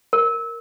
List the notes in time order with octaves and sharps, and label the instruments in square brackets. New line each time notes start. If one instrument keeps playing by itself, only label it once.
[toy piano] A#4